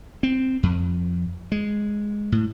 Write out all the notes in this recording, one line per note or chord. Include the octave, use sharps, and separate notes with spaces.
C4
F2
G#3
A2